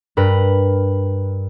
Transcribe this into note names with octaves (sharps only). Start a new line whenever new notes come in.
G2 A#4 B4